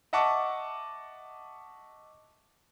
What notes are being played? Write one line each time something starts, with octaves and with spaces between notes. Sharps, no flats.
D#5 E5 F#5 A5 C#6 D6